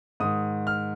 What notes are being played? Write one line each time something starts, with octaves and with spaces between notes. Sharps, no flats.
G#2 D#3 D#6
F6